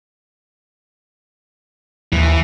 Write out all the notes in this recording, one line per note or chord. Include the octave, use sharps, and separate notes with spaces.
D#2 E3